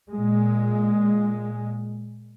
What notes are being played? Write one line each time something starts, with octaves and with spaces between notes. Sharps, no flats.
A#2 G#3